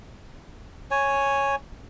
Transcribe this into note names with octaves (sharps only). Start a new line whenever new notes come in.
C#5 G#5